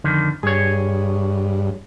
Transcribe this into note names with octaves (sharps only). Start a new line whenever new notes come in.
F2 D3 D#3
G2 G#4 C#5